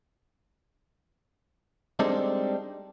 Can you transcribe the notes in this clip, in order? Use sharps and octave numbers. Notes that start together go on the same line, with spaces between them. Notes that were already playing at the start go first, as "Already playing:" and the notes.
G3 G#3 C4 D4 D#4 A4